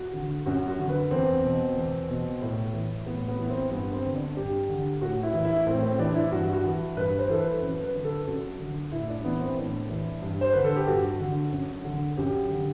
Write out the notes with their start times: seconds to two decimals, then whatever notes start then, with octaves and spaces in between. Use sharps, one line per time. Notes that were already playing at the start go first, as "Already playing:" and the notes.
Already playing: F#4
0.13 D3
0.46 F#2 F#4
0.68 F#4
0.79 D3
0.89 B4
1.11 E2 C4
1.44 B2
1.76 E2
2.09 B2
2.42 A2
2.74 E3
3.06 A2 B3
3.28 B3
3.39 E3
3.50 C4
3.71 G2 B3
3.93 C4
4.04 D3
4.15 D4
4.36 G2 G4
4.69 D3
5.01 A2 F#4
5.23 E4
5.34 E3
5.45 E4
5.67 A2 C4
5.83 C4
5.99 E3 D4
6.15 E4
6.32 G2 F#4
6.53 F#4
6.64 E3
6.97 G2 B4
7.19 C5
7.29 E3 A4
7.40 B4
7.62 F#2
7.83 B4
7.94 D3
8.04 A4
8.27 F#2 F#4
8.60 D3
8.92 A2 E4
9.08 D4
9.24 E3 B3
9.40 C4
9.57 A2 D4
9.89 E3
10.22 G2
10.41 C5
10.53 D3 B4
10.64 A4
10.76 G4
10.87 G2 F#4
11.19 D3
11.52 F#2
11.84 D3
12.17 F#2 G4
12.50 D3